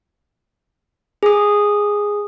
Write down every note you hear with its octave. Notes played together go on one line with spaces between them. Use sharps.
G#4 D#6